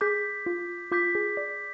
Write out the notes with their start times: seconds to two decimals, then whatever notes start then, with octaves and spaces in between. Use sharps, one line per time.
0.01 G#4 D6 G6 B6
0.46 F4
0.92 F4 D6 G6 B6
1.15 G#4
1.37 D5